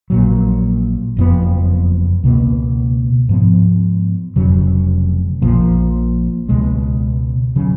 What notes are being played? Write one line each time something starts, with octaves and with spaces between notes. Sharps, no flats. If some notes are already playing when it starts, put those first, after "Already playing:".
A#1 A#2 F#3
F#1 F2 F3 B3
C#2 B2 A#3
G#2 F3 B3
F1 F2 C#3 F#3
A#1 A#2 F3
C#2 B2 G#3
C#3 F#3